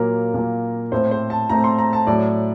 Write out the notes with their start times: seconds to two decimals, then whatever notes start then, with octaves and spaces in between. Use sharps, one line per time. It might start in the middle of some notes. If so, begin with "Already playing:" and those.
Already playing: A#2 F#3 A#3 A#4
0.34 A#2 F#3 A#3
0.92 A2 A3 C4 C5
1.11 C5
1.30 A5
1.49 A2 A3 C4 A#5
1.64 C6
1.78 A#5
1.93 A5
2.07 A2 F#3 A3 D5